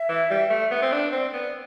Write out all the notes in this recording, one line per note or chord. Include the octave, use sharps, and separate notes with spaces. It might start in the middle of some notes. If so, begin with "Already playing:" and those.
Already playing: E5
E3
G3
A3
B3
C4
D4
C4 D5
B3